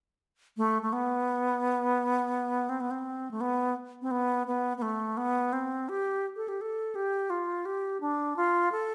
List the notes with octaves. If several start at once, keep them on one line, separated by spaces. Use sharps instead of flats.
A3
A3
B3
C4
B3
C4
A3
B3
C4
B3
B3
B3
A3
B3
C4
G4
A4
G4
A4
G4
F4
G4
D4
F4
A4